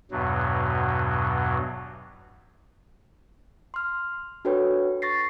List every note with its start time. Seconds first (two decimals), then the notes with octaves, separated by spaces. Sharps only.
0.11 E2 G2 B2 F#3
3.74 C6 F6
4.45 D4 F#4 A4 B4 C#5 G5
5.02 C#6 A6 A#6 C7